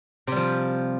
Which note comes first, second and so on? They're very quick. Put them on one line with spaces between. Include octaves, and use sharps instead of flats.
C3 G3 F3